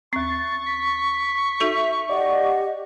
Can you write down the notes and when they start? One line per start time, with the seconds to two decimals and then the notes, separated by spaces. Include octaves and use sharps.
0.13 D#2 C4 C#6 A6
0.66 B6
1.60 D#4 F#4 A4 E5
2.09 G4 D5 D#5 F#5